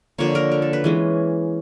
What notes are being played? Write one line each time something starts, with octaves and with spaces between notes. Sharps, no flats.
D3 F3 A#3 C#5
A#4
A#4
A4
B4
E3 G#3 C#4